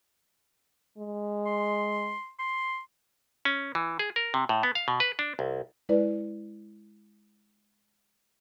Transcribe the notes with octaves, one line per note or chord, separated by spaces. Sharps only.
G#3
C6
C6
C#4
E3
G#4
A#4
C3
A2
B3
F5
B2
B4
D4
C2
G#3 E4 B4 D5